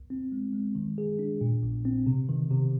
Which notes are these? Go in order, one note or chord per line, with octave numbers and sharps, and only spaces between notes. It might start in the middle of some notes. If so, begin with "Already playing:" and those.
Already playing: C2
C4
G#3
G#3
D#3
G#4
D4
A#2
A#1
C4
C3
D#3
C3